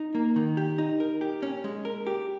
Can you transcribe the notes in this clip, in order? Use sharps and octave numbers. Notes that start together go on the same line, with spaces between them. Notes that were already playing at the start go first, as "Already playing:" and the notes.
Already playing: D#4
A#3
D#3
G4
D#4
A#4
G4
C#4
G#3
A#4
G4